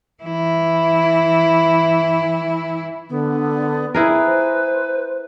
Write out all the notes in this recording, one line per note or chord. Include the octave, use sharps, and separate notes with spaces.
E3 E4
D3 B3
E4 G#4 A#4 B4
C5